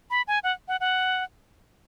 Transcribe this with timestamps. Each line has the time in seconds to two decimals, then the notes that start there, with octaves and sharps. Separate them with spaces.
0.10 B5
0.28 G#5
0.44 F#5
0.68 F#5
0.80 F#5